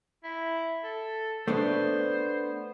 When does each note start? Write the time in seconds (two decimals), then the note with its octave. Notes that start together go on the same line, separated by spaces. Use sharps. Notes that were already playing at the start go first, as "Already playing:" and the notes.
0.24 E4
0.84 A4
1.48 A3 B3 D4 C5